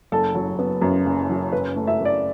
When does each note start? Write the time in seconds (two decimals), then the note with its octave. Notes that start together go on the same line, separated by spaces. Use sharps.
0.12 F#1 A4
0.35 F#3
0.59 B3
0.82 F#2
1.06 F#1
1.30 F#3
1.52 F#2 B4
1.76 A3
1.87 E5
2.00 F#2
2.05 D5